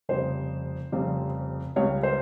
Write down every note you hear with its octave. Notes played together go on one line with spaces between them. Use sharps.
F1 F2 C#3 G3 C5
F1 F2 C#3 G3
C#2 C#3 G3 C#5
C5